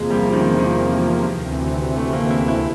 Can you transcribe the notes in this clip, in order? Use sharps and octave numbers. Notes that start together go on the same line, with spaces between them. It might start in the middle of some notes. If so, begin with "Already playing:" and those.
Already playing: E2 C3 F3 G#3 A#3
G3
D#3
D#3
D2 C3 E3
A3
A#3
E4
E4